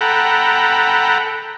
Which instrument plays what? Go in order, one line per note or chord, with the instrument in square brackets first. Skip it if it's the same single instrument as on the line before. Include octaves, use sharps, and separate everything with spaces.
[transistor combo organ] A4 F#5 G5 A#5 B5